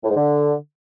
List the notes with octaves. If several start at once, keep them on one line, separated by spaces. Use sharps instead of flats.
A2
G#2
D3